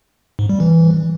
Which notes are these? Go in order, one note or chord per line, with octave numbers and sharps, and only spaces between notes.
G#2
G3
E3